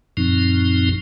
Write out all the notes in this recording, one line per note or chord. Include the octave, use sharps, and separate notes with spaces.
F#2 A#2 F3 C4 D#4